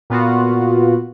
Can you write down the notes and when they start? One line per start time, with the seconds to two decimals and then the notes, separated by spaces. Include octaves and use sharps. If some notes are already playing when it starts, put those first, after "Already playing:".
0.10 A#2 B3 F4 F#4